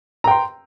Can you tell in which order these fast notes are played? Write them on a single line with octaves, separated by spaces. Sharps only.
A#5 G5 C6